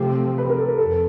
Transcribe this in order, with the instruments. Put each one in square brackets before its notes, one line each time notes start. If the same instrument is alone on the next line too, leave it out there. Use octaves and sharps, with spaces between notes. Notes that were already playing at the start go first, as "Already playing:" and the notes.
Already playing: [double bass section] C3 F3 A3 C4 [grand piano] G4
[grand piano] B4
A#4
A4
A#4
[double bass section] F2 [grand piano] A4